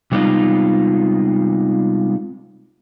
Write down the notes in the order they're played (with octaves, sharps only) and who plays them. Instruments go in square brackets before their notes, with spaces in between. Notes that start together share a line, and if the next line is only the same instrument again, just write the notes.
[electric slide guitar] C3 G3 G#3 B3 D#4 F4